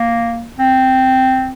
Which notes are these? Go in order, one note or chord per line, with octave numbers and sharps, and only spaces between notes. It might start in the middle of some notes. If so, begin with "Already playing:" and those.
Already playing: A#3
C4